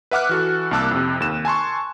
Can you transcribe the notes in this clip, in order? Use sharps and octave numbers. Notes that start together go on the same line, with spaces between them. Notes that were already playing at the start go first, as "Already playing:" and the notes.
B4 E5 F#5 D6 F6 F#6
E3 F#4 A4
C2 A#3 A5 D6 E6 F#6
F2 C3
D#2 E7
G#5 A5 C6 C#6